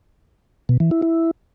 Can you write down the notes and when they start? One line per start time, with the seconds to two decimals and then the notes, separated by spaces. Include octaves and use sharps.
0.69 B2
0.80 E3
0.91 E4
1.02 E4